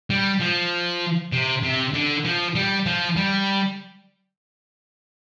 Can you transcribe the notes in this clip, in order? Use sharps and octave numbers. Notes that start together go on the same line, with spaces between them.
G3
F3
C3
C3
D3
F3
G3
F3
G3